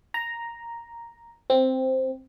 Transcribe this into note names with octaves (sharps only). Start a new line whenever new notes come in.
A#5
C4